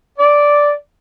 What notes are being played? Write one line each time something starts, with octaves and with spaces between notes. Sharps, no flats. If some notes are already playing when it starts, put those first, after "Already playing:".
D5